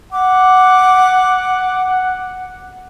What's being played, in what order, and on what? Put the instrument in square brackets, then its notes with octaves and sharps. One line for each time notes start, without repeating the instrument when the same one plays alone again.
[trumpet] F#5 [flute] D6